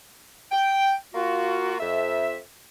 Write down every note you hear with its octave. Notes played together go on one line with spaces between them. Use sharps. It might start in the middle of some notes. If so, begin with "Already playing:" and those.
G5
A#3 F4 F#4
F2 E5